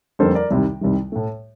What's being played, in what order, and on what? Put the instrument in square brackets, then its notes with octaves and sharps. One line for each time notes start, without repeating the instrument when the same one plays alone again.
[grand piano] F2 D3 G3 A#3 A4 C5
A#4 D5
C2 C3 D#3 G3
C2 C3 D#3 G3
A2 A3